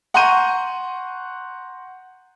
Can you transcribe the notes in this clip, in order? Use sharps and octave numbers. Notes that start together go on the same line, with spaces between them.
F#5 A#5 C6 C#6 G6 D#7